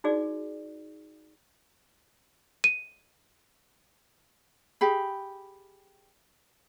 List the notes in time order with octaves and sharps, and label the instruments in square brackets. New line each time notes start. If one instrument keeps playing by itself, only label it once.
[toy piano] D#4 F#4 G#4 D5
[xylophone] D#7
[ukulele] G4 G#4 B5